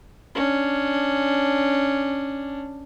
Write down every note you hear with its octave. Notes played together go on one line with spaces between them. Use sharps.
C#4 D4